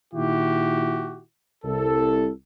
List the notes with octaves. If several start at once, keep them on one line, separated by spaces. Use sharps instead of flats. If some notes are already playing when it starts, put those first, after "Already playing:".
A#2 D#3 E4 F#4 G4
C2 A4